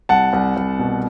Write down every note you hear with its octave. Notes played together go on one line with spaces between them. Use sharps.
C2 F#5 A5
C2
C2
B2